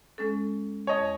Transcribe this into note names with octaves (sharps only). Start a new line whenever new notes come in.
G#3 C#4 A4
E2 C#5 D#5 A5